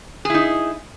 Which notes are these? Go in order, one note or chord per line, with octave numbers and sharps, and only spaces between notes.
D#4 E4 G#4